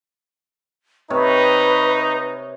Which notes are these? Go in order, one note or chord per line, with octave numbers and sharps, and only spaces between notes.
C3 D#4 B4 C#5